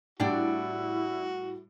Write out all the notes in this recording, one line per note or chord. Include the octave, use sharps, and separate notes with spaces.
A2 G3 D4 E4 F#4 D5 G5